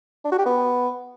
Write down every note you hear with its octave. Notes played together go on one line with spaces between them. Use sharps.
D4
F#4
G4
B3